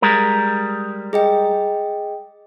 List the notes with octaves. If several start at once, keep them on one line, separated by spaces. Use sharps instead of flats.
G3 G#3 A#4
G#4 D#5 G5